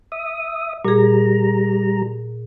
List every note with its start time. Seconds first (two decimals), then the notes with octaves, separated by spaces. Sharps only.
0.12 E5 D#6
0.85 A#2 G3 G#4 A#5